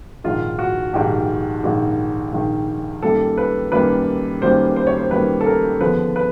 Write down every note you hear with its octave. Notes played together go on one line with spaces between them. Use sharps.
A#1 G#2 D#3 F4
F#4
A#1 G#2 D#3 G4
A#1 G#2 D#3
A#1 G#2 D#3
F#2 D#3 G3 A#3 A4
B4
F#2 D#3 G3 A#3 B4
F#2 D#3 G3 A#3 C5
C5
C#5
C5
F#2 D#3 G3 A#3 B4
A4
A#4
D#2 D3 F3 G#3 B3 B4
B4